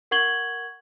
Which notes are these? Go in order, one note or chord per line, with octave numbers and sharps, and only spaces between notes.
A#4 F#5 C#6 G#6 F#7 G7